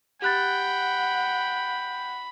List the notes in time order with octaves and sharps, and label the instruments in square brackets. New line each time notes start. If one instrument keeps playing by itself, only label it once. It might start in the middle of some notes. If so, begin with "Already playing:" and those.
[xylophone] G4 F#6 A6 [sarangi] F#5 [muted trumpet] G5 [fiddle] B5